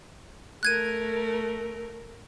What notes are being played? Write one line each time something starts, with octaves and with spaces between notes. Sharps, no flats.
A3 A#4 F#6 G#6 D#7